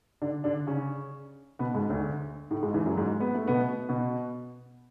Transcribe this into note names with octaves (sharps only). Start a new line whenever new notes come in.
D3 D4
D3 D4
C#3 C#4
B2 B3
G#2 G#3
D2 D3
A2 A3
G#2 G#3
E2 E3
F#2 F#3
G#2 G#3
B3
A3
B2 B3
B2 B3